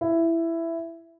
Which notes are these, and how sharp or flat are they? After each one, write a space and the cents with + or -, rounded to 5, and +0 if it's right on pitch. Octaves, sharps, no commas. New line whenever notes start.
E4 +10